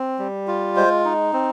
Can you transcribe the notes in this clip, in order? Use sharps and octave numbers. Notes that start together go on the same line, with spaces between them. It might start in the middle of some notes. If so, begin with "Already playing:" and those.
Already playing: C4
G3
F4
G#3 C5
D#4
C4